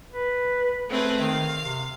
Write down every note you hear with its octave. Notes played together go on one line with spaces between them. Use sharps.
B4
A3 C4 G#4 B4
D#3 F5
C3